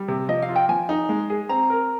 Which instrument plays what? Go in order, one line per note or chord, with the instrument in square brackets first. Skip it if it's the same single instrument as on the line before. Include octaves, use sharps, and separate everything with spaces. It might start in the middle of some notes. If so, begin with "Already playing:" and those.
Already playing: [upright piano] G3
C3
[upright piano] F3 [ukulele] D#5
[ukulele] F5
[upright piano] F4
[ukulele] G5
[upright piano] F3 [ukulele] G#5
[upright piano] D#4
G#3
G#4
[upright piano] C4 [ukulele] A#5
[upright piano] A#4